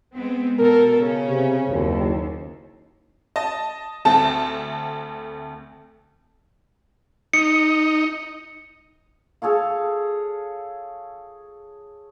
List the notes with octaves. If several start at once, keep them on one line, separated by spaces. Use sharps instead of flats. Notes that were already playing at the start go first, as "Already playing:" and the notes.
G#3 B3 C4
B2 A4 A#4
C#3 C#4
C3
F#1 D#2
D#5 A5
D2 A3 C4 A5
D#4 C#7
G#4 A4 C#5 F5